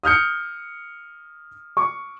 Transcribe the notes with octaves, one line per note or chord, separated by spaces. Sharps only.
D#6 F6 G6 C#7
C#6 D6